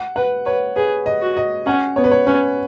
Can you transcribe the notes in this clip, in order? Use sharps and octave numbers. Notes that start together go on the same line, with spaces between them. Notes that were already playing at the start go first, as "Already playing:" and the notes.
Already playing: F#5
B4 F#5
B4 C#5
G#4 B4
D#5
F#4
D#5
C#4 F#5
B3 C#5
B4
C#5
C#4 B4